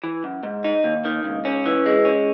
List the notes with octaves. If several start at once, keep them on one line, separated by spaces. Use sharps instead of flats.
E3
F#2
G#2
D#4
D#2
D#3
C#2
C#4
E3
G#3
C#4